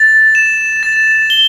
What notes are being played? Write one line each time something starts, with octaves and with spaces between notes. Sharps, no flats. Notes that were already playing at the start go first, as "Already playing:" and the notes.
Already playing: A6
E7
A6
G7